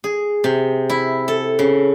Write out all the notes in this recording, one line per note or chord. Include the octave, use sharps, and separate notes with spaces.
G#4
C3
E4
A4
C#3